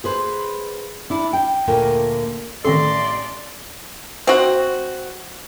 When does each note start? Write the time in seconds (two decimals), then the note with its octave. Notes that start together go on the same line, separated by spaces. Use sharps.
0.04 G#4 B4 C5
1.10 D4 E4 D5
1.33 G5
1.67 D2 A#2 D3 A#4 G5 G#5
2.65 A1 D#3 C4 A4 D5 C6 C#6 A#6
4.27 C4 F#4